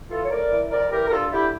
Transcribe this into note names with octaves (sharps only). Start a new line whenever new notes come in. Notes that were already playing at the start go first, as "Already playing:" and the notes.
E3 F4 A4
C#5
A2 A#4 D5
E3
F2 A#4 D5
E3 G4 A#4
A#4
G2 F4 A4
D3 E4 G4